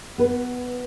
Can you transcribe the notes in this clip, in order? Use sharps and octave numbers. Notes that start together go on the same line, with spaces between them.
B3 B4